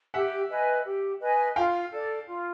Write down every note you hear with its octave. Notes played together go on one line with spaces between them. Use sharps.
G4 E5 F#5
B4 D#5 G#5
G4
B4 D#5 G#5
F4 F5 G5
A4 D5
F4